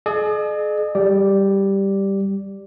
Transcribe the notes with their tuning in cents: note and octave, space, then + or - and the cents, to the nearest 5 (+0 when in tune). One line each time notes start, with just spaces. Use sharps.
G#4 +40 D#5 -45
G3 +0 G4 +0 D5 +0